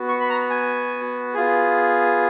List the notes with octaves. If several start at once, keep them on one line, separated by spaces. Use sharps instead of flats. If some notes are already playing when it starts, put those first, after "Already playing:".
Already playing: B3 F#4
C#6
B5
A#5
G#5
B3 F4 G#4